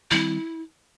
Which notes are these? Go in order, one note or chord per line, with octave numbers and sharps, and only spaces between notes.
D#3 G3 C4 E4